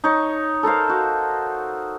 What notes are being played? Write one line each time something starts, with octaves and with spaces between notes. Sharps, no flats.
D#4 C#5
A4 A#4 C5 F5
F#4